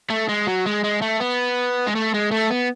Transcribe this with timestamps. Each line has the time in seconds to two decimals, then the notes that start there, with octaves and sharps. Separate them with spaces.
0.10 A3
0.28 G#3
0.47 F#3
0.66 G#3
0.84 G#3
1.02 A3
1.20 B3
1.87 G#3
1.95 A3
2.14 G#3
2.31 A3
2.50 B3